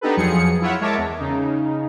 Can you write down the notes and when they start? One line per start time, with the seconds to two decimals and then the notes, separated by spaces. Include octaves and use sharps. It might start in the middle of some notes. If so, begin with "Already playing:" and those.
0.01 B3 D4 D#4 G4 A4 B4
0.17 F2 F3 F#3 G#4 C#7
0.61 E4 F4 C#5 E5 F#5
0.80 G#3 A#4 C#5 E5 A5 D6
0.98 E2
1.19 C#3 D#4